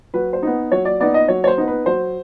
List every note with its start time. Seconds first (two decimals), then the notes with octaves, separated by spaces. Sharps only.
0.14 F#3 B4
0.33 C5
0.43 B3 D#4
0.72 F#3 C#5
0.85 D5
1.00 B3 D#4 D5
1.14 D#5
1.28 F#3 C#5
1.44 C#5
1.47 C5
1.58 B3 D#4
1.67 B4
1.86 F#3 C5